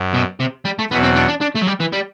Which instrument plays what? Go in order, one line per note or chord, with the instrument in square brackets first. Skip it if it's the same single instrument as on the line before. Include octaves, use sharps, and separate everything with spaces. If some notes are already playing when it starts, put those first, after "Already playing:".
Already playing: [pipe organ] F#2
[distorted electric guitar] B2
C3
G3
A3
[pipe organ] E2 B2 F#3 [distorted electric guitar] B3
[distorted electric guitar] C4
D4
D4
D4
A3
F#3
G3
E3
G3